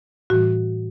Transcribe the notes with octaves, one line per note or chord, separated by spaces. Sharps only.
A2 E3 G3 F#4